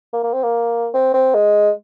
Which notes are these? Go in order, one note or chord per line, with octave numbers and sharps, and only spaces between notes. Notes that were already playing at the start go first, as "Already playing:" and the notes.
A#3
A#3
C4
A#3
C4
C4
G#3